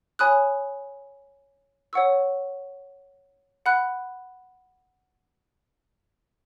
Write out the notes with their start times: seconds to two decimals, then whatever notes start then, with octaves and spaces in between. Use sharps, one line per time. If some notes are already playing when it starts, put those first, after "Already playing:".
0.19 C#5 G#5 B5 D#6 F#6
1.93 C#5 F#5 C#6 E6
3.66 F#5 B5 F#6